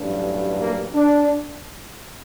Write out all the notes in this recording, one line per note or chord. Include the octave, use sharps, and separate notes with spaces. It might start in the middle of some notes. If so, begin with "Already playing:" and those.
Already playing: A1 G2 F#3
A#3
D4